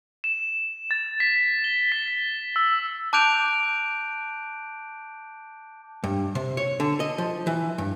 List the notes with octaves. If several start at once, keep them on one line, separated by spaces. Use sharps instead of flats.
E7
A6
B6
G7
B6
E6
A5 D6 F#6 G6 D7 F7
G2
C3
C#5
D3
D#5
F3
E3
G2